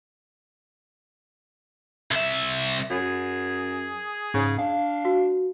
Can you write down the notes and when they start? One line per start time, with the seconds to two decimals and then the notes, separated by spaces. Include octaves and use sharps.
2.11 C2 E5
2.90 F#2 G#4
4.34 G#2 C#3
4.59 D4 F5
5.05 F#4